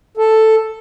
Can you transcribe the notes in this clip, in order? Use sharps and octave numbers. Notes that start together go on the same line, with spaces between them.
A4